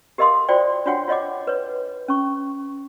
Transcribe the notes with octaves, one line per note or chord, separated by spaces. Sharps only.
G4 A#4 D#5 F5 C6 D#6
F4 F#4 C5 D5 G5
D4 F4 F#4 C#5 F#5 G5
F4 C#5 D#5 F#5 D6
B4 C#5
C#4 C#6